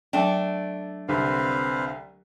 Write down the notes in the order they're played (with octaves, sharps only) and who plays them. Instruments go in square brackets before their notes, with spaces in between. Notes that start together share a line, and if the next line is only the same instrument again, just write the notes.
[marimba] F#3 G5 [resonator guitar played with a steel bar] A3 D4
[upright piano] C2 D3 [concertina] C4 B4 F5